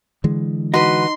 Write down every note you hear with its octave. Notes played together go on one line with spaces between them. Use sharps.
D3 E3 G#3
D#4 F#4 B4 C6